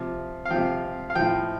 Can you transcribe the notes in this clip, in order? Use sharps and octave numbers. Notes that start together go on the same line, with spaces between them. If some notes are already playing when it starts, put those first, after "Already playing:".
Already playing: C3 F3
F5
C3 F3 G5
F5
A2 F3 G5